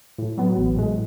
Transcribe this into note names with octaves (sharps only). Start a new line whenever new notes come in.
A2
F#3 B3
A1
A2 G#3